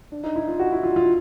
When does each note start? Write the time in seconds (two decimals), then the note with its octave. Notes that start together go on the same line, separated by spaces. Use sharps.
0.12 D4
0.24 D#4
0.36 E4
0.48 F4
0.59 F#4
0.72 E4
0.83 F4
0.96 F4